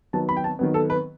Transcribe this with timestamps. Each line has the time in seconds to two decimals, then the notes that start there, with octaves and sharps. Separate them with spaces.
0.13 D#3 F#3 B3 A5
0.29 B5
0.37 G5
0.44 A5
0.59 D#3 F#3 B3
0.74 A4
0.90 B4